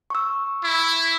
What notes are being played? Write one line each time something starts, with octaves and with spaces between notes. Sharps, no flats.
C#6 E6
E4